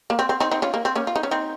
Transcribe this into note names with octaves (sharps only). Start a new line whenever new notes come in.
A#3
C4
C4
C4 D#4
C4 D#4
C#4 F4
A#3
C4
A#3 C#4
F4
D#4
C#4
C4 D#4